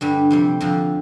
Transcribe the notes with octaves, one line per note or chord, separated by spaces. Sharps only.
G2 D3 G3
F2 C3 G3
F2 D3 F3